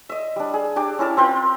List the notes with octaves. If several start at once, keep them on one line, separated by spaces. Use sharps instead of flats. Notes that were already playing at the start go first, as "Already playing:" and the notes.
D#5 E5
G3 D4
G#4
D4 G4 D6
C#4 E4 A#4 A5
C4 F4 A#4 G5